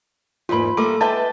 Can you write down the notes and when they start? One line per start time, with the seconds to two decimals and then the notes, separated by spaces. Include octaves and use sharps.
0.49 E2 G#2 A#3 F4 B5
0.77 G3 A3 A#3 A4 D6
1.01 G#3 B4 E5 G5 A5